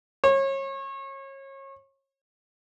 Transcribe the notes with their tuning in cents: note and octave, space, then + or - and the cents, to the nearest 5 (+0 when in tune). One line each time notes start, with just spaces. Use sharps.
C#5 -30